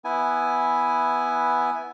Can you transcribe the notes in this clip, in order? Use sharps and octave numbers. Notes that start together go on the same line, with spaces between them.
B3 E4 G#5